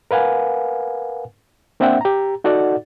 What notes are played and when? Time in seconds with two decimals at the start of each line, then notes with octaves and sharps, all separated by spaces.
0.11 A#4 B4 F5 F#5 G#5
1.80 A#3 C4 D4 E5 F#5 G5
2.01 G4 A#5
2.44 D#4 F#4 A4 D5 F#5